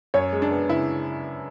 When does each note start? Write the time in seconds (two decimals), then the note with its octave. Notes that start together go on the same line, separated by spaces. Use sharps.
0.14 F#2 C#5
0.32 G#3
0.42 D4
0.51 B3
0.69 C#3 E4